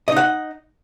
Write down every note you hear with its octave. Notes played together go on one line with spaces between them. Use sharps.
D#4 D#5 F#5